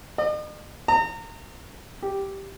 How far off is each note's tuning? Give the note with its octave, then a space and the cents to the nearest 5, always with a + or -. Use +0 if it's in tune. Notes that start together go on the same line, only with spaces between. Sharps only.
D#5 -45
A#5 -35
G4 -5